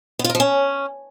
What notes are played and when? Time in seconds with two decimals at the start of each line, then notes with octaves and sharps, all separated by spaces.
0.19 B3
0.24 F4
0.30 A#4
0.35 F3
0.40 C#4